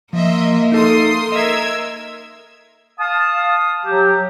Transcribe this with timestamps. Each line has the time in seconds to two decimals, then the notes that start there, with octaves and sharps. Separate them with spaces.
0.13 F3 A#3 D#5 E5 C6
0.72 D#4 A4 C6 D#6
1.32 A#4 D#5 E5 E6 G#6
2.99 F5 A5 D#6
3.85 F#3 G4